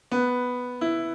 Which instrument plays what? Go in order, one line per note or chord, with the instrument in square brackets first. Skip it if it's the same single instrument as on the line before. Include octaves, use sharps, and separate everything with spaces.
[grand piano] B3
E4